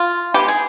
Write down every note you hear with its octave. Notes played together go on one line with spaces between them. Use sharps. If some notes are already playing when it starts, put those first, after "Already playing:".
Already playing: F4
G#3 B3 G4
G#4